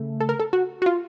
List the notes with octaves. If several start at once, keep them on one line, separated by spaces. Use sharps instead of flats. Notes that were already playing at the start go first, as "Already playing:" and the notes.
Already playing: C#3 A3
A4
A#4
A4
F#4
F#4
F4